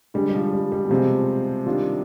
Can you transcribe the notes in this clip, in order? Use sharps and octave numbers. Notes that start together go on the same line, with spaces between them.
D3 G3 G#3 D4
G3
F3
G3
G3
B2
C3 F3 G#3 C4
D#3 G3 D4 F4